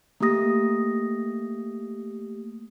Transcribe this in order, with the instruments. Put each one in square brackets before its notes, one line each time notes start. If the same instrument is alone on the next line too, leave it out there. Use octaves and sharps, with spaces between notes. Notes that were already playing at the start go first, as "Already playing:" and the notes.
[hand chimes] A3 A#3 G4 D#6 A#6